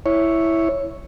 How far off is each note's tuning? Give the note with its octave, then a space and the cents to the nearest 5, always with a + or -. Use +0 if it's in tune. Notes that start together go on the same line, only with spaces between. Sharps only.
E4 +0 C#5 +0